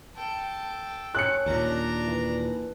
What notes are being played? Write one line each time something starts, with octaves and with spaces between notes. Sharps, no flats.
A4 G5
C#4 F#6 C#7
D#2 A#2 D4 A#5
E3